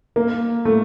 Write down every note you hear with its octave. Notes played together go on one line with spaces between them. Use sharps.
A#3
A3